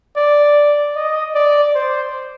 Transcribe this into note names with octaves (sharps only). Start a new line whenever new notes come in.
D5
D#5
D5
C5